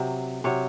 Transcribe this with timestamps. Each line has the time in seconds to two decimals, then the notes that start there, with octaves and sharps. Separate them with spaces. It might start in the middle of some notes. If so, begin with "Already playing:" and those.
Already playing: C3 F#3
0.44 C3 F#3 C#5